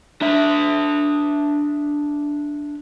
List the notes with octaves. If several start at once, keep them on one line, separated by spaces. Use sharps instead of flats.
D4 E5